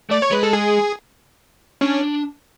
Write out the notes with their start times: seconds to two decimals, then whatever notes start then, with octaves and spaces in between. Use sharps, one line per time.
0.10 A3 D5
0.22 C#5
0.31 G#3 B4
0.43 A4
0.53 G#4
1.81 C#4 D4